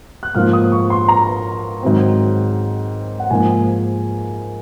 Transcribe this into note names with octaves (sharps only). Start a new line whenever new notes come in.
F#6
G#2 F3 A#3 F6
D#6
C#6
C6
A#5
G#2 D#3 F#3 C4
F#5
G#2 F3 A#3 G#5